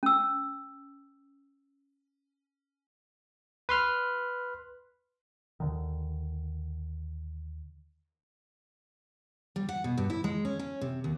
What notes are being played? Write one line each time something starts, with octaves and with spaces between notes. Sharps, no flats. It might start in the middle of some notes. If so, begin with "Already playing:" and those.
C#4 E6
B4 C6 F6
D#2 D3 D#3
G3
F#5
B2
G2
E4
G#3
C#4
C#4
C3
D#2